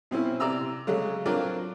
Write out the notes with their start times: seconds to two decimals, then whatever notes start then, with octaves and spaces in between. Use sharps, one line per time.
0.11 B2 C4 C#4 E4
0.40 C3 D5 A#5 E6
0.87 C#3 F#3 G#3 A3
1.26 F#3 C4 D4 F4 A#4 D5